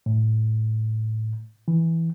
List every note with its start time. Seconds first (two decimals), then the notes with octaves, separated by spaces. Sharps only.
0.06 A2
1.68 E3